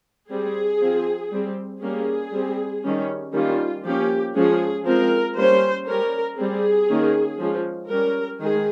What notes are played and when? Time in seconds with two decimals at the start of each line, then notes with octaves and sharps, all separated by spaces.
0.30 G3 C4 G#4
0.80 F3 C4
1.32 G3 C4
1.82 G3 A#3 C#4 G#4
2.32 G3 C4
2.84 D#3 G3 C#4
3.33 D#3 G3 A#3 C#4 F4
3.84 F3 A#3 C#4 G4
4.35 F3 G#3 C#4 G#4
4.85 F3 G#3 C4 A#4
5.36 G3 A#3 C#4 C5
5.87 G3 C#4 A#4
6.37 G3 C4 G#4
6.88 D#3 A#3 C#4
7.39 F3 G#3 C#4
7.89 G3 C#4 A#4
8.40 D#3 G#3 G#4